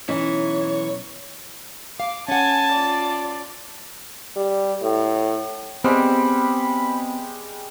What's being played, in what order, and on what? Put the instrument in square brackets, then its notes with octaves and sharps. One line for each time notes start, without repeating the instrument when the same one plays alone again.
[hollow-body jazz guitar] B1 C#4 E4 [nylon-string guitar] E3 D#4 [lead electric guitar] C#5
[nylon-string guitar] F5 [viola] D6
[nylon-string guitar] C#4 F#5 [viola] G#5 [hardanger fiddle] A5
[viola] F4 D5
[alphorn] G3
A2
[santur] G3 G#3 G4 [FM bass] B3 [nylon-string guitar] C4 [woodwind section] B5